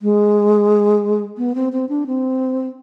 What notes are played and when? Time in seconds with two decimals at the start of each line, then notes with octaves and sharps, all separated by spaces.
0.02 G#3
1.38 B3
1.55 C4
1.73 C4
1.89 D4
2.07 C4